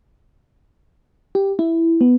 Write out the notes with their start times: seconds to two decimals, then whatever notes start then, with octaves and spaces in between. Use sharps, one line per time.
1.35 G4
1.59 E4
2.01 B3